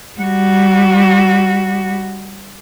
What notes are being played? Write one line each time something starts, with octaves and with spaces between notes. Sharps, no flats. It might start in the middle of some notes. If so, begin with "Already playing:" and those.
G3 F#4